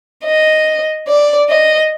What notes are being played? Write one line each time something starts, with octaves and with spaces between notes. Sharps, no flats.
D#5
D5
D#5